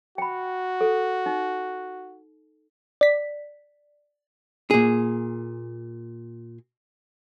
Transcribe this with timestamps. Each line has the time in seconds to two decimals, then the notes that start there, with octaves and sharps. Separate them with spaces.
0.18 F#4 G5 B5
0.81 A4
1.26 D#4
3.01 D5 B6
4.71 A#2 G#4